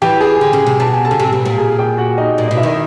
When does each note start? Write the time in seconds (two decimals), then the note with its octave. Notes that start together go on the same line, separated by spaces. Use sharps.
0.02 E3 G4 G5
0.20 G#4 G#5
0.41 D3
0.53 C#3
0.67 C3
0.80 B2 A5
0.93 G#5
1.05 A4 A5
1.11 C#3
1.20 C3
1.33 B2
1.45 A#2
1.58 G#4 G#5
1.79 G4 G5
1.97 F#4 F#5
2.18 D#4 D#5
2.38 A#2 D5
2.47 D#4 D#5
2.51 B2
2.57 E4 E5
2.63 D#3 D#4 D#5